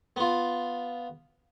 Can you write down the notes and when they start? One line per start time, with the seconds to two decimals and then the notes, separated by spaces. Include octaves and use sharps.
0.16 B3 F4